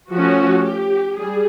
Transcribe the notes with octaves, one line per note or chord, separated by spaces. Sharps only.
F3 A3 C#4 F#4
G4
G3 G#4